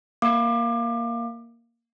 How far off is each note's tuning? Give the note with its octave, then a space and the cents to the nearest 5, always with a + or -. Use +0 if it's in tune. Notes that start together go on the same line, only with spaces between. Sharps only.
A#3 +0 F5 +0 D6 +25